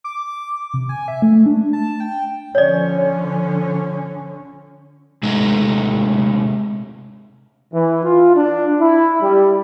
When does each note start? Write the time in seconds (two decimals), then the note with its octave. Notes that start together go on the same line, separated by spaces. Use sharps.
0.04 D6
0.74 C3
0.89 G#5
1.08 E5
1.22 A3
1.46 D4
1.73 A5
2.00 G5
2.55 D3 F3 C#4 C#5 D5
5.23 C3 G#3 A3 D#4
7.73 E3
8.03 F4
8.35 D4
8.80 E4
9.21 G3